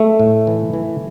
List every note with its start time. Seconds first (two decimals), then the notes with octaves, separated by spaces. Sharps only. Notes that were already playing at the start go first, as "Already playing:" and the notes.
Already playing: A3
0.19 A2
0.47 E3
0.73 E3